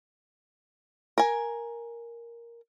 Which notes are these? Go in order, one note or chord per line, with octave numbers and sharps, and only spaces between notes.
A#4 G#5